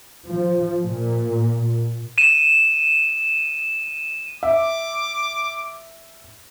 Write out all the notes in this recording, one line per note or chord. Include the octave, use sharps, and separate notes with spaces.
F3
A#2
D#7 E7
E5 D6